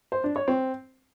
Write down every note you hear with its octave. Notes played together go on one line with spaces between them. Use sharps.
C5
D4
C#5
C4